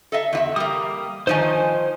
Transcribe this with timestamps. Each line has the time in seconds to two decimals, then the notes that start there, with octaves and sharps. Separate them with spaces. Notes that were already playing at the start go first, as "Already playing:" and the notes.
0.12 A4 D#5 E5
0.33 E2 F4 E5
0.56 G3 A#3 D#6
1.27 D#3 F3 D#4 C5 G#5